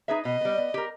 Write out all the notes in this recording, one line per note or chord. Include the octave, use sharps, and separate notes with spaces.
D#4 G#4 B4 E5
B2 D#5
G3 B3
B3
G4 A#4